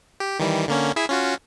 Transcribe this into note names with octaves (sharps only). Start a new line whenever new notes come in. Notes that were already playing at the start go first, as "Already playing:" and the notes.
G4
D#3 E3 G3
D3 A#3 C#4
E4 G#4 E5
C#4 F4 F#4